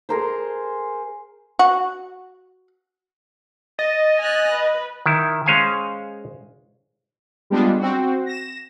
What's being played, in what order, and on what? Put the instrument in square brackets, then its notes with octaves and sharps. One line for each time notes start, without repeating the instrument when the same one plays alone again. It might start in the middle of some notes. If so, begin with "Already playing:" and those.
[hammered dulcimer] G#4 A#4 C5
[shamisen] F#4
[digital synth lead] D#5 [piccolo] A6
[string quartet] G#5 F6 F#6
B4
[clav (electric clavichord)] D#3 E4
G#3 C#4 C5 F5 G#5
[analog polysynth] G3 G#3 B3 D4 F4
C4 F#4
A#6 E7